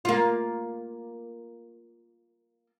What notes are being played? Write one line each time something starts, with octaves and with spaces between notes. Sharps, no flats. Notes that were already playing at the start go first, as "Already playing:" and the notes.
A#3 F4